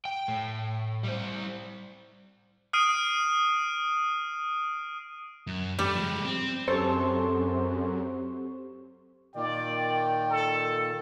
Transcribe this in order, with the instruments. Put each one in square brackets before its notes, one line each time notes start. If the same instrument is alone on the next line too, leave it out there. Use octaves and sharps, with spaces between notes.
[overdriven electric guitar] G5
A2
G3 C5
[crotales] D#6 F6 C7 D7 D#7
[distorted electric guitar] F#2
[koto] G3 [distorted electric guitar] A3
[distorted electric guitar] F3 G#3
C4
[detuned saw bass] F#2 [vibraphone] C4 G4 C#6 [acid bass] A4 [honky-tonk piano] C5
[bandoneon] A#2 D#3 [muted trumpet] D5 [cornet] G5
[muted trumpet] A4